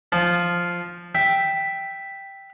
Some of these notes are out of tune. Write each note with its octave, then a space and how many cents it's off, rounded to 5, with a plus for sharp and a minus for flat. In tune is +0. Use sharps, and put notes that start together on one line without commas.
F3 +0 A5 -25
E5 +0 G5 +0